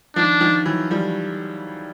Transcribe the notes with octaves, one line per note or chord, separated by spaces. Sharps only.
D#3 F3 D4
D#3 F3
E3 F#3
F3 G3